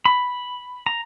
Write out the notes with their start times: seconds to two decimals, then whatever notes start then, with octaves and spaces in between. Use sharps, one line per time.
0.05 B5
0.86 A#5